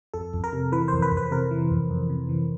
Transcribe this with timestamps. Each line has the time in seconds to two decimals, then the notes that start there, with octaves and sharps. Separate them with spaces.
0.14 F2 A4
0.33 F2
0.44 A#4
0.53 C3
0.72 E3 B4
0.88 F2 C5
1.02 B4
1.11 F2
1.17 B4
1.31 C3 A#4
1.51 E3
1.71 F2
1.91 F2
2.10 C3
2.29 E3